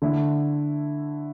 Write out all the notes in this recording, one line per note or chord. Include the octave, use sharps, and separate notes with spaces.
D3 A3 E4